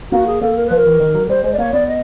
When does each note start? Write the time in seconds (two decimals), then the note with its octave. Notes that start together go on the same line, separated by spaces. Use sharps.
0.11 A#3 F#4
0.27 G#4
0.41 A#3 A4
0.56 A#4
0.67 F3 B4
0.76 A#4
0.86 E3
1.00 D#3
1.15 F#3
1.29 G3 C5
1.44 G#3 C5
1.53 D5
1.58 A#3 C#5
1.73 B3 D5
1.88 D#5